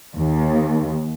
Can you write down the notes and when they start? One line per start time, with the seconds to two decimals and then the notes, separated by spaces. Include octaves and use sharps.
0.15 D#2